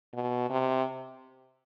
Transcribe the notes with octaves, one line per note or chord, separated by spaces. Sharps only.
B2
C3